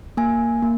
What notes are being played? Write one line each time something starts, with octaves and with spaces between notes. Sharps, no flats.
A#3 G#5
A#3